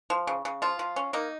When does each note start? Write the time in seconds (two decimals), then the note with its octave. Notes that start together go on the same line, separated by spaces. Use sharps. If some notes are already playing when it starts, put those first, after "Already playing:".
0.10 F3
0.27 C#3
0.45 C#3
0.62 F3 F4
0.79 F3
0.96 C#4
1.13 A#3 D#4